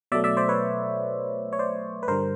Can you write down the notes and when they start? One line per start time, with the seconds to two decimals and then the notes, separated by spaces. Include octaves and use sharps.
0.12 B2 F#3 A3 D5 E5
0.24 D5 E5
0.37 C5 D5
0.49 B4 C#5
1.53 C#5
1.59 C5 D5
2.03 B4
2.08 G2 D3 G3 A#4 C5